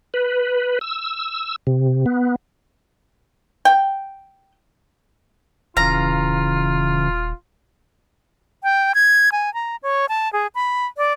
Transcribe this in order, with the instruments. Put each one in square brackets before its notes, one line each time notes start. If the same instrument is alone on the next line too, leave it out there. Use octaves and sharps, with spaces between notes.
[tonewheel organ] B4
E6
C3
B3
[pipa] G5
[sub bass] D#1 [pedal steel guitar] C#3 E3 F5 [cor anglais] F4 [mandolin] A#5
[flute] G5
G#6
G#5
A#5
C#5
A5
G#4
B5
D5